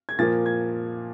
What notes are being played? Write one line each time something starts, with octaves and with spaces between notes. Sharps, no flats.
G#6
A#2 F3 A#3 A6
G#6